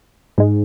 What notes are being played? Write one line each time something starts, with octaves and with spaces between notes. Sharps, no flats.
G#2 G#3